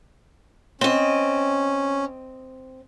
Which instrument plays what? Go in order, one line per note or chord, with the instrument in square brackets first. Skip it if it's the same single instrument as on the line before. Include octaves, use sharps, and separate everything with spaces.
[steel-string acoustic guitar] C4 D#5 [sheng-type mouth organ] C#4